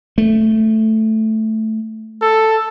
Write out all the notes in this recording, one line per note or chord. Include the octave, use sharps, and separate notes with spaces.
A3
A4